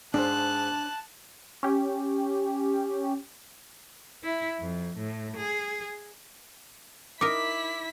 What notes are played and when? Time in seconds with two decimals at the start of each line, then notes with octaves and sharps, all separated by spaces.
0.14 G#2 D4 C5 A5 F#6
1.63 C#4 G4
4.23 E4
4.60 F2
4.98 A2
5.37 G#4
7.21 D#4 E4 A#4 D6 B6